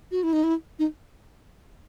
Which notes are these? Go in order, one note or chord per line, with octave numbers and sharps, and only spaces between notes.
F#4
E4
D#4
E4
D#4